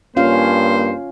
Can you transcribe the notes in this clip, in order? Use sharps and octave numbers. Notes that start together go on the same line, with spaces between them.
G2 A#3 C#4 F4 C5 F5